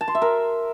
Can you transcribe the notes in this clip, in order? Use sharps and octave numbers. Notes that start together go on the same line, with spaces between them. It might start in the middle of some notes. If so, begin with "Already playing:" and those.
A5
C6
E5
A#4